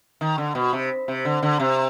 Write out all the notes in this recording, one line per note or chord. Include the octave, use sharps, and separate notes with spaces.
D#3
D3
B2
C3
C3
D3
D3
C3